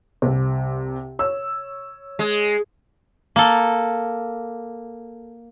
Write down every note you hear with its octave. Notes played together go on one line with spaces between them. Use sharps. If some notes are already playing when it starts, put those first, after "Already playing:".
C2 C3
C#5 E6
G#3
A#3 A4